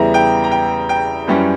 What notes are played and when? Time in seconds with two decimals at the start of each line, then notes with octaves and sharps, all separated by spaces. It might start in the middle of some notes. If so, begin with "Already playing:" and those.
Already playing: E2 C#3 G3 B3 E4 A#5
0.14 G5
0.44 A#5
0.51 G5
0.89 G5
1.28 F#2 E3 G3 C#4